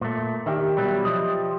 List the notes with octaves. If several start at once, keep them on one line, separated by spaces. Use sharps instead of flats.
A#2 A3
D#3 G4 D5 E5
B2 F#3 G3
F3 D#5